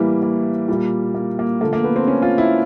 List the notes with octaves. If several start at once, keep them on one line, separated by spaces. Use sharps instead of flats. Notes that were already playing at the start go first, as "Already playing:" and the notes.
Already playing: A2 E3 G3 A#3
A#3
A#2 G3 A#3
A#3
A#3
D3 F3 A3 A#3
A#3
B3
C4
C#4
F4
E4